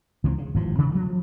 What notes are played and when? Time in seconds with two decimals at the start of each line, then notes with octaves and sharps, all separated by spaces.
0.24 C#2 E3 G3 C4
0.38 C#3
0.54 G#1 G2 E3 F3
0.78 C3 D#3 E3 C#4
0.92 F3 F#3 A3